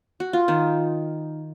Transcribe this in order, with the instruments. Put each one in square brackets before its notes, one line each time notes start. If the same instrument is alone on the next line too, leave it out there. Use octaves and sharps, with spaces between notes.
[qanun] F#4
F4
D#3 D#4